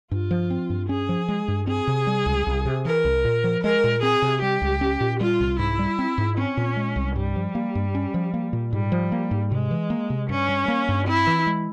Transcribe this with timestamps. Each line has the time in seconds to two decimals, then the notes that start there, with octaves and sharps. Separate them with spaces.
0.11 G2 F4
0.31 F3
0.50 C4
0.70 G2
0.89 C#4 G#4
1.09 F3
1.28 G#3
1.48 G2
1.67 C4 G#4
1.87 C3
2.07 G3
2.26 C#2
2.47 C2
2.65 C3
2.85 E3 A#4
3.05 C2
3.25 A#2
3.44 F3
3.63 G#3 A#4
3.84 A#2
4.02 C4 G#4
4.22 C3
4.42 G3 G4
4.62 C#2
4.81 C#4
5.00 A#2
5.20 G3 F4
5.40 C2
5.59 G#2 E4
5.79 G3
5.99 C4
6.18 G#2
6.38 C4 C#4
6.57 A#2
6.77 G#3
6.96 C2
7.16 G2 G3
7.36 F3
7.55 A#3
7.75 G2
7.95 C#4
8.14 F3
8.34 A#3
8.53 A#2
8.72 G#2 G3
8.92 F3
9.12 A#3
9.31 G#2
9.51 C3 G#3
9.71 E3
9.90 A#3
10.10 C3
10.29 G2 C#4
10.49 G3
10.68 A#3
10.89 G2
11.07 C4 E4
11.27 E3
11.47 G#3